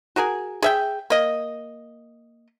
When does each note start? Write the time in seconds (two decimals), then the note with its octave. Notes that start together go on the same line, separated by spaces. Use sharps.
0.16 F#4 G#4 A#4 G#5
0.62 G#4 E5 G5
1.10 A#3 D#5